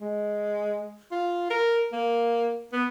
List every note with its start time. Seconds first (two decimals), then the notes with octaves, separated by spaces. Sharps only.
0.01 G#3
1.12 F4
1.50 A#4
1.92 A#3
2.73 B3